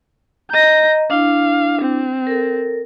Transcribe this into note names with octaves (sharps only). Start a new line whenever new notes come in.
D#5 A#5 G6 A#6
D4 E4 F5
C4
A4 A#4